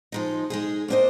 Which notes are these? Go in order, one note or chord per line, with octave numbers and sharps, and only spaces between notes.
F3 G#3 D#4
G#3 D#4 G#4
A#3 D4 G#4 C5 D#5